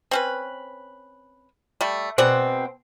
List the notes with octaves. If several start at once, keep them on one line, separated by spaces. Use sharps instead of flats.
C4 C#4 B4
G3 A3
B2 G#3 C4 D5 F#5